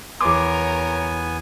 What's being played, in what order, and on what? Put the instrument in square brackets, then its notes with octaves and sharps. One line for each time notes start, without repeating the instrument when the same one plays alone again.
[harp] E2 C6 [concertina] B3 G#5 [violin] A#4 C#5 [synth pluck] D6